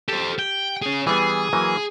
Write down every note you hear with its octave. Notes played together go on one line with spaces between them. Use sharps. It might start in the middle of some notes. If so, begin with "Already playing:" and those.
G4 A4 C5
G5
C#4 G#4
E3 G3 B3 G#4
E3 F#3 A#3